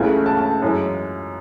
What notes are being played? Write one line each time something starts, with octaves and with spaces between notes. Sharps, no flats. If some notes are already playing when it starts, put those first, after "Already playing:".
Already playing: C#2 C#3 E3 A3 C#4 G#5
A5
A5
F#2 E3 G#3